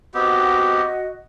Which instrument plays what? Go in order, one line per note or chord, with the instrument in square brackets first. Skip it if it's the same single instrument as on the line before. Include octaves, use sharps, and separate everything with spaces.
[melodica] B3 C4 G4 [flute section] F#4 D#5